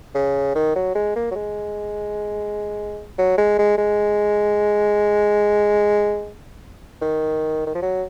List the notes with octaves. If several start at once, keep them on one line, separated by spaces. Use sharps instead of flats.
C#3
D#3
F#3
G#3
A#3
F#3
G#3
F#3
G#3
G#3
G#3
D#3
D#3
F3
F#3